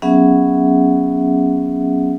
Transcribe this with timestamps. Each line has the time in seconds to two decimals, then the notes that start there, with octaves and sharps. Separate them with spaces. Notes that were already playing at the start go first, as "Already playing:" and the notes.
0.02 F#3 B3 C#4 G#4 E5 F#5